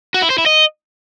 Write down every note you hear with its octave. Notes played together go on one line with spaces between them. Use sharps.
F#4
E4
C5
E4
D#5